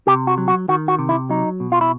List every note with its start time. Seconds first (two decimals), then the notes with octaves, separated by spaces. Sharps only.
0.07 C3 G4
0.27 F#4
0.38 F#3
0.48 F#4
0.68 D#3 F#4
0.88 F#4
0.99 C3
1.09 E4
1.29 F#3 D#4
1.60 B2
1.72 F4
1.81 E4